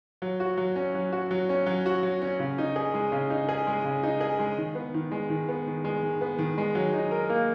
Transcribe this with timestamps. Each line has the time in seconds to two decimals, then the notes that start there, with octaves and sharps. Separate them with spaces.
0.22 F#3
0.40 F#4
0.57 F#3
0.75 C#4
0.95 F#3
1.12 F#4
1.31 F#3
1.49 C#4
1.66 F#3
1.86 F#4
2.03 F#3
2.22 C#4
2.40 C#3
2.58 D#4
2.76 G#4
2.94 G#3
3.12 C#3
3.30 D#4
3.49 G#4
3.67 G#3
3.84 C#3
4.03 D#4
4.21 G#4
4.39 G#3
4.58 D#3
4.75 B3
4.94 D#3
5.11 G#3
5.30 D#3
5.49 B3
5.67 D#3
5.84 G#3
6.03 D#3
6.21 B3
6.39 D#3
6.58 G#3
6.75 F#3
6.93 D#4
7.11 A#4
7.29 A#3